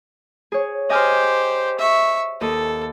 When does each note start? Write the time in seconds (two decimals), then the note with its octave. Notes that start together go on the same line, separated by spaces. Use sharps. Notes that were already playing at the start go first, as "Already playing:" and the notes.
0.52 G#4 C#5
0.90 G4 C5 D#5 G#5 F6
1.79 E5 C#6
2.41 D#2 A4 D#5